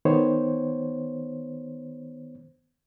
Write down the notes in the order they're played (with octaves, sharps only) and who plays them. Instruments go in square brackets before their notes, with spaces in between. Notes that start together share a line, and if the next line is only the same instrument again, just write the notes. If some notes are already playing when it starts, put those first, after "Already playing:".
[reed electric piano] D#3 B3 C5 C#5